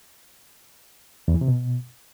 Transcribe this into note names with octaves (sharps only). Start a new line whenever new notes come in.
E2
E3
C3
B2